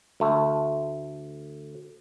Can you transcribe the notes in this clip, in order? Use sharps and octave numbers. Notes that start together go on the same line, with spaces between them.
D2 A3